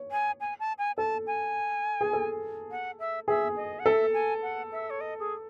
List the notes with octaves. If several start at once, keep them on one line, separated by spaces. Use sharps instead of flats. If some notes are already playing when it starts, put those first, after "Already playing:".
Already playing: C#5
G#5
G#5
A5
G#5
A4 A5
G#5
G#4
A4
F#5
E5
G#4 E5
D#5
F#5
A4 E5
G#5
F#5
E5
C#5
D#5
G#4